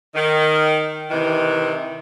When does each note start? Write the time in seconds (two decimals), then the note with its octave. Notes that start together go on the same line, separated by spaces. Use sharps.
0.15 D#3
1.10 C3 D#3 E3